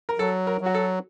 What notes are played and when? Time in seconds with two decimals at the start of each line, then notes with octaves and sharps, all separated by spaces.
0.09 A#4
0.19 F#3 A4
0.47 A#4
0.61 F#3
0.66 F#4
0.75 A4